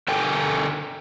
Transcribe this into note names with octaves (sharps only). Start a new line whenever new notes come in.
D3 A4 A#4 G5 G#5